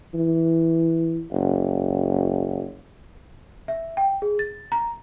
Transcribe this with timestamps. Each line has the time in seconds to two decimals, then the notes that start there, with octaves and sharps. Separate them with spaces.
0.15 E3
1.31 F#1
3.68 E5
3.97 G5
4.22 G#4
4.39 A6
4.72 A#5